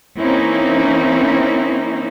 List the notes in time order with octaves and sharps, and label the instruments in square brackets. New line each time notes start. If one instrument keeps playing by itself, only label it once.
[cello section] E3 A#3 C4 C#4 D#4 E4